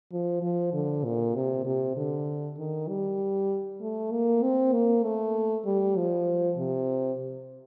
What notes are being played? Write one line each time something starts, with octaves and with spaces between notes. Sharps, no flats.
F3
F3
D3
A#2
C3
C3
D3
D#3
G3
A3
A#3
C4
A#3
A3
G3
F3
C3